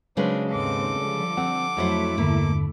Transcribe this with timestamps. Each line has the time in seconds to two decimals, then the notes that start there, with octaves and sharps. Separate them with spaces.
0.17 C#3 F#3 G#3 C4 D4 B4
0.51 D#2 G#2 C4 A4 D6
0.98 D3 F3 G3
1.37 C4 F#5
1.77 F2 F#3 A3 E4 C5
2.18 E2 G2 D3 A#3